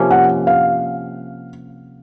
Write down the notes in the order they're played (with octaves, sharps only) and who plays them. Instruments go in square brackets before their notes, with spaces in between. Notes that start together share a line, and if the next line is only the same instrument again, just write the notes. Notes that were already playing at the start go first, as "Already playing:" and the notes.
Already playing: [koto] C3 F3 A#3 C#4
[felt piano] F#5
F5